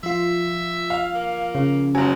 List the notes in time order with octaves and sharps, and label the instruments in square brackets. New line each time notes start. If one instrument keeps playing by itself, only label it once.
[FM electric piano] F3 F4 [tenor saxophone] E5
[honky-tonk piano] F5
[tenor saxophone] A#3
[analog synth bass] C#3
[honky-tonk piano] F#1 F#3 [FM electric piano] G#5